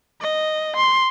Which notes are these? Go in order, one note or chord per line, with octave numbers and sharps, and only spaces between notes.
D#5
C6